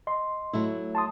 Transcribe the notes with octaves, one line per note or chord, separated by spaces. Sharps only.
D#5 C6
F#3 A3 E4
A5 C6 D#6